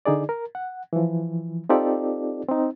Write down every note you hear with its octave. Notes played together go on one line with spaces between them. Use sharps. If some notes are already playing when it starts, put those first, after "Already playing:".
D3 D#4 G#4 D5
A#4
F#5
E3 F3
C4 D#4 F4 G4 A4 D5
C4 D#4